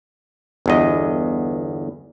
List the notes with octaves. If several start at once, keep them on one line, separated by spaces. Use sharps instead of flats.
G1 E2 D#5